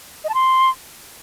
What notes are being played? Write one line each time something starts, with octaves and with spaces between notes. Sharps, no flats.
D#5
A5
C6